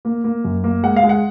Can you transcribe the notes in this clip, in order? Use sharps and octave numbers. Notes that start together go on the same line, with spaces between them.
A#3
A#3
F#2
A#3
G#3 F#5
F5
G#3
F#5